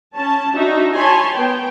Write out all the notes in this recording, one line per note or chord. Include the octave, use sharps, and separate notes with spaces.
C#4 A5
D4 D#4 F#4 E5
C#5 G#5 A5 B5 C6
B3 G5